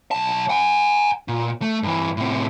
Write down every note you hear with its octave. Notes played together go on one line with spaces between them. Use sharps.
B1 A5
F#5 G#5
A#2
A3
G2 E3
A2 C3